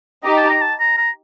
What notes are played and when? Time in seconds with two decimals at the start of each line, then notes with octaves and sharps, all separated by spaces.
0.24 D#4 G4 D#5
0.37 A5
0.49 A#5
0.61 A5
0.80 A#5
0.97 A#5